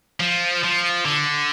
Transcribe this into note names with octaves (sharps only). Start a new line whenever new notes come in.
F3
F3
D3